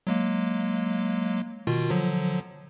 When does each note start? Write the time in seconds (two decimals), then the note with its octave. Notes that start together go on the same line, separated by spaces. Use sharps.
0.07 F#3 G#3 A#3
1.67 B2 D#3 F4
1.90 D3 F3 F#3